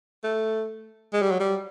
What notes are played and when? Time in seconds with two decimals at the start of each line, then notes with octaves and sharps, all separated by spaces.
0.24 A3
1.13 G#3
1.22 G3
1.31 F#3
1.40 G3